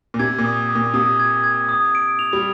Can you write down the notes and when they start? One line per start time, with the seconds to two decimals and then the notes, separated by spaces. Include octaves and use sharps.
0.14 A#2
0.19 C3 G#6
0.38 A#2
0.44 D#6
0.69 D#6
0.75 A#2
0.94 C3 D#6
1.19 G#6
1.44 G#6
1.69 D#6
1.95 D7
2.19 F7
2.33 G3